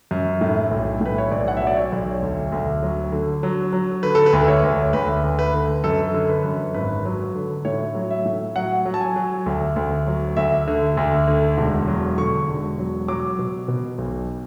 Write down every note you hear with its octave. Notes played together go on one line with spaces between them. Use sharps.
F#2
A2
B1
A2 B4
C#5
B1 D5
F#5
F#3 E5
D5
C#5
B1
D2
D2
F#3
D3
F#3
F#3
D3 B4
A4
B4
D2
C#5
D2
D2 B4
D2
B4
D3
F#2 A4
D3
B4
F#2
G#1 B4
F#3
D3
A2 C#5
F#3
E5
A2
F#3 F#5
F#3
A5
G#5
F#3
D2
D2
F#3
D2 E5
D3
D2
D3
E1
F#3
D3 C#6
E1
F#3
F#3 D6
B2
B2
B1